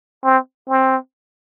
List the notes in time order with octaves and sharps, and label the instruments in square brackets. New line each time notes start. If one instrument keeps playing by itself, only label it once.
[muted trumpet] C4
C4